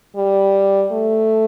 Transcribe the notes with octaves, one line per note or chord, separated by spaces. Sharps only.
G3
A3